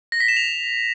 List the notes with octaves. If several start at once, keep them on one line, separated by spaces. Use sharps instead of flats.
A#6
B6
E7
F7